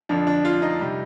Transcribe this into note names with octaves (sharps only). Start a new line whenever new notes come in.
F2 D3 F3 D4
D4
F4
D#4
C3 G3